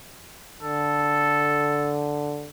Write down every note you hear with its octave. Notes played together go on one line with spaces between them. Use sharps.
D3 A4